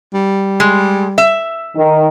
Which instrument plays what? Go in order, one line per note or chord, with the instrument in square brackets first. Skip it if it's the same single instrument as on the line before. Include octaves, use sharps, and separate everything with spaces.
[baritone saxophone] G3
[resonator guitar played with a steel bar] G#3
E5
[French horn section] D#3